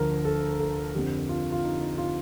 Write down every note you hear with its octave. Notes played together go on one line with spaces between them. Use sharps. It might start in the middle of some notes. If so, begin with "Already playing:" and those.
Already playing: D2 D3 F3 A#4
A4
A4
F2 D3 F3 G4
F4
F4
D#4
D#4
F4